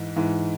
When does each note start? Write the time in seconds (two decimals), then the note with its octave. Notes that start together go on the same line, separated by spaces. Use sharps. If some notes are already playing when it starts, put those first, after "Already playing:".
Already playing: G#2 E3
0.16 G#2 E3